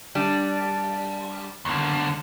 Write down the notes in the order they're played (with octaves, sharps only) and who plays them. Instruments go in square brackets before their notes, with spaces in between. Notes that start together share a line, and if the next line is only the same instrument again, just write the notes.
[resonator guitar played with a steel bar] G3 D4
[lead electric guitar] D#2 D3